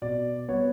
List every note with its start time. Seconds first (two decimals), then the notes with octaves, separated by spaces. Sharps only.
0.02 B2 D5
0.48 G3 B3 C#5